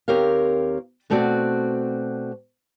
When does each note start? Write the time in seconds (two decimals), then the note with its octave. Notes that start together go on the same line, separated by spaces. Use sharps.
0.08 D#2 C4 G4 A#4 C#5 F5
1.10 B2 A3 C4 F#4 D5